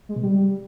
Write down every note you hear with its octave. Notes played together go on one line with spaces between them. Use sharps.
G#3
B2
G3